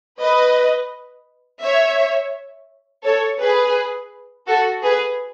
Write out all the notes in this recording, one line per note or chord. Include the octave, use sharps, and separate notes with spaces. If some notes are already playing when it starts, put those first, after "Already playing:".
B4 D#5
C#5 E5
A4 C#5
G#4 B4
F#4 A4
G#4 B4